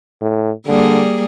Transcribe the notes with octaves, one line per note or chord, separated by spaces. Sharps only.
A2
D3 G3 A#3 G#4